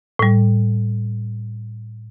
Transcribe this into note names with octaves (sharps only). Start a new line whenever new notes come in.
A2 G3